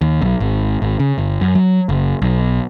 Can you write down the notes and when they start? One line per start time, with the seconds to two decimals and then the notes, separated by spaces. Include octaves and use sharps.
0.01 D#2
0.22 B1
0.40 G#1
0.82 G#1
1.00 C#3
1.18 G1
1.41 F#2
1.55 F#3
1.89 F#1
2.22 B1